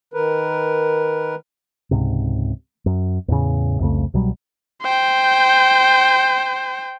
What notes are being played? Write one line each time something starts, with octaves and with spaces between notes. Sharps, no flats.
D#3 A#4 B4
C#2 G#2 C3
F#2
E2 A2 C#3
C2 F2 C#3 A3
C2 B2 F#3 G3
C5 G5